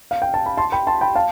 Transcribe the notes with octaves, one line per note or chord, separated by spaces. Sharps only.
F5
G5
A5
B5
A5 C6
G5 B5
A5 C6
G5 B5
F5 A5